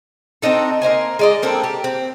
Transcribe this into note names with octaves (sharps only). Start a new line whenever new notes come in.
C4 D4 D#4 A4
A#3 D#4 C5 G#5
G#3 D5 D#5
A#3 C4 D4 A4
G4
C4